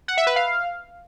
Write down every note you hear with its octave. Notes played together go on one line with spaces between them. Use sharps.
F#5
E5
B4
F5